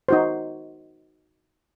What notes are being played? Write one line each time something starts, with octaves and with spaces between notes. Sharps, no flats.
D#4 F#4 C5